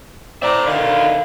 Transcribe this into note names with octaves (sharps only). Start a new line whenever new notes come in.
A2 C4 D5 E5 A#5
B2 D3 D#3 E4 F5